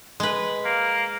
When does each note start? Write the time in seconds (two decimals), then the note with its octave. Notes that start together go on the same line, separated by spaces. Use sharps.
0.20 G#3 B4
0.65 A#3